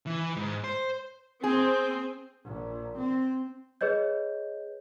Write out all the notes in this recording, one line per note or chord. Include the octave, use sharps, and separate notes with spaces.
E3
G#2
C5
C4 G#4
A#1
C4
G#4 B4 C#5 D#5 G6